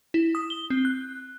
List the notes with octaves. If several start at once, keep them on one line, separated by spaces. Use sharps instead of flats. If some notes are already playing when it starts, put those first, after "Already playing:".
E4
D#6
G7
C4
F#6